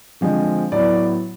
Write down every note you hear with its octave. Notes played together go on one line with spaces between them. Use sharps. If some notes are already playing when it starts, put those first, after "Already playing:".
D3 F3 G#3 C4
A2 F#3 B3 D5